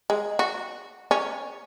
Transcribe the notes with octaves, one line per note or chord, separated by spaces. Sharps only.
G#3
F#4
C#4